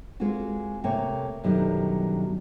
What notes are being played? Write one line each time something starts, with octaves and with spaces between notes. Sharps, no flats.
G#3 A#3 C4 F4 F#4
C3 A3 A#3 A#4 C#5 G5
F#2 B2 D3 D#3 F#3 G3